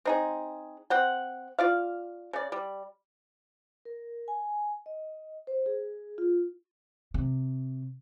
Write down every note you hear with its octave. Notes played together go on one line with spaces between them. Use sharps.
C4 D#4 G#4
C4 F#5 G5
F4 D5 F5
C#3 D5
G3
A#4
G#5
D#5
C5
G#4
F4
C3